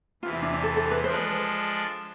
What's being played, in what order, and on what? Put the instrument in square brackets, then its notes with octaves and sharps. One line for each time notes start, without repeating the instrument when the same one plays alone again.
[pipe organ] E2 C3 E3 [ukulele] F4
[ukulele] E4
D4
D4
A4
B4
A4
B4
[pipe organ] F3 G#3 D4 A4 [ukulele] C5
[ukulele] B4